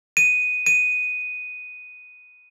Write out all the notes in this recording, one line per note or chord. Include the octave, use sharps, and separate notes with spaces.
D#7
D#7